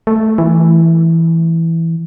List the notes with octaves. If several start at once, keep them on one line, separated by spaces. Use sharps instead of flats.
A3
E3